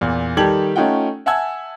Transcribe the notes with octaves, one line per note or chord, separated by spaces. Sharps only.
E2 A#2
D#3 G3 G4 A4 G#6 F#7
A3 C#4 D#4 F4 F#5 G5
E5 F#5 G#5 A5 E6 G#6